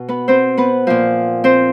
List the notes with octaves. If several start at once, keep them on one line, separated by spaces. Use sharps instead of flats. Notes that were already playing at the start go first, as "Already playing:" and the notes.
Already playing: B2
B3 B4
C4 C5
B3 B4
A#2 F3
C4 C5